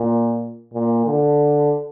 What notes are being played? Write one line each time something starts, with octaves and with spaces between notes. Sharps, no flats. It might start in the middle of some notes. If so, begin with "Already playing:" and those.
Already playing: A#2
A#2
D3